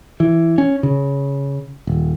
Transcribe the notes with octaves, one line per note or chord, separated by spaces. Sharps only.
E3
C#4
C#3
D#1